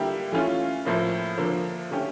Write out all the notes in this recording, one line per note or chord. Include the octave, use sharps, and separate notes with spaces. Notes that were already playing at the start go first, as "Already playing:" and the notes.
Already playing: D3 G3 A#3 E4 G4
E3 A3 C#4 F4
A2 F3 A#3 E4
D3 F3 A#3
D3 A3 C#4 G4